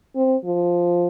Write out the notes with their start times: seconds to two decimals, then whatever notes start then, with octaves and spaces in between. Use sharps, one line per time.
0.16 C4
0.45 F3